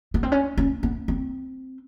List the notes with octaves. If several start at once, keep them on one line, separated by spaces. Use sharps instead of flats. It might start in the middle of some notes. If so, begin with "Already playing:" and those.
B3
C4
C#4
C#4
B3
C4